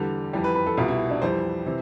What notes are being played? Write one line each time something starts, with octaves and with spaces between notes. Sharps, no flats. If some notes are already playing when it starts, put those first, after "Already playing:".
Already playing: E2 D3 G3
F2 E3 G3 G4
B4
B4
A4
C2 B2 G3 F4
E4
D4
F2 E3 G3 C5
C3 E3